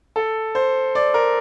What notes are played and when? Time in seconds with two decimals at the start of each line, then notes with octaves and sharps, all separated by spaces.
0.16 A4
0.55 C5
0.95 D5
1.14 A#4